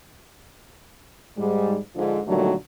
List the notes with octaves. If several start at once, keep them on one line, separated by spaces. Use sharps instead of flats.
G#2 G3 G#3
G#2 D3 F3
A#2 D3 D#3 F#3 G3 A3